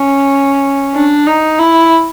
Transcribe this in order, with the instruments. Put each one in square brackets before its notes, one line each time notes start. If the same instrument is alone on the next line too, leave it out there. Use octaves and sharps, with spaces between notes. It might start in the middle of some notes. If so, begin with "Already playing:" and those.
Already playing: [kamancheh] C#4
D4
D#4
E4